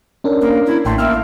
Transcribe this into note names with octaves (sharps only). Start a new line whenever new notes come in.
C#4 D4 A#4
A#3
E4
A1 A3 G5 C6
A#3 E5 E6 F6